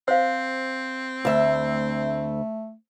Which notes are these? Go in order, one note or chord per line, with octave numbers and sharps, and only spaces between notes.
C4 C5 F5
D2 A3 E5